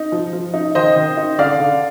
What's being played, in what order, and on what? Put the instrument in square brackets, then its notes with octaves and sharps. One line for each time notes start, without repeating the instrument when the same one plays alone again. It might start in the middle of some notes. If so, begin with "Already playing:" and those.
Already playing: [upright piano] D#4
F3
F3
D#4
D#3 C5 D#5
D#3
D#4
D3 D5 F5
D3